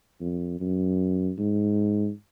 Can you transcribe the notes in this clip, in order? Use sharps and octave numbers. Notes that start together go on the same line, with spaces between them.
F2
F#2
G#2